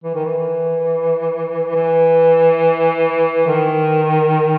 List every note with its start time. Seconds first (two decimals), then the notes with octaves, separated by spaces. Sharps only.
0.04 E3
0.15 D#3
0.25 E3
1.75 E3
3.47 D#3